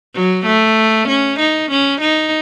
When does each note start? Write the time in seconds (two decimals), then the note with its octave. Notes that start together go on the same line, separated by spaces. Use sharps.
0.15 F#3
0.46 A3
1.08 C#4
1.39 D#4
1.71 C#4
2.01 D#4